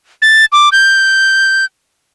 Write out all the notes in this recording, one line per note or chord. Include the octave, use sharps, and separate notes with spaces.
A6
D6
G6